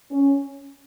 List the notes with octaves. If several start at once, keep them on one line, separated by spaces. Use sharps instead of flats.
C#4